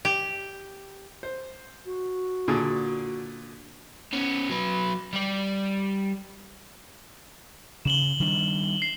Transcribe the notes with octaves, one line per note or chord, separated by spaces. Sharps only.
G4
C5
F#4
A#2 D3 G#4
B3 C#4
F#3 B4
G3 D5
C#3 E7 F#7 G7
D#3 G3 D4
C7